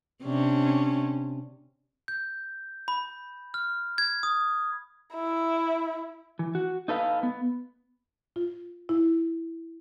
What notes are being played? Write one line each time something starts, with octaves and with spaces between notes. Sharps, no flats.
C3 C#4 D4
G6
B5
F6
G#6
D#6
E4
E3
F#4
D#4 A4 B4 F5
B3
F4
E4